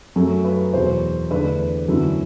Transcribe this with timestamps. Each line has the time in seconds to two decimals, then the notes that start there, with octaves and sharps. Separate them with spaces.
0.16 F#2 F#3 A3
0.45 B4
0.73 E2 B2 F#3 C5
1.30 E2 D3 A3 D4 B4
1.88 F#2 D3 F#3 B3 E4